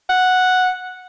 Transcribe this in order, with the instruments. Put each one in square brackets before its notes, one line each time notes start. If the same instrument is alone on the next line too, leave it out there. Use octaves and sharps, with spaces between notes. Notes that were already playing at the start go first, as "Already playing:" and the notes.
[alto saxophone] F#5